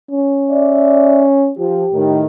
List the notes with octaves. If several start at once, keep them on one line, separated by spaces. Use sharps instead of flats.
C#4
D5 E5
F3 G4
A2 D#3